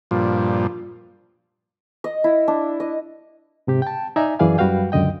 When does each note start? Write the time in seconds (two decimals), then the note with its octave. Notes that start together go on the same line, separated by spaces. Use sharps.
0.11 G2 A#2 F3
2.04 D#5
2.24 E4
2.48 D4
2.80 D#5
3.67 G#2 C3 G4
3.82 G5 A5
4.16 D#4 D5 E5 G#5 A#5
4.39 F#2 E3 G#4 D5 F5 G#5
4.58 F#2 G3 F#4 B4 F5 G5
4.92 C#2 F#2 D3 D#5 G5